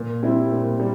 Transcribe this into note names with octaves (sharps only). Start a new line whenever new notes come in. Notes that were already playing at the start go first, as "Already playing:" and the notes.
Already playing: A#2
G3 C4 E4
A#2
G3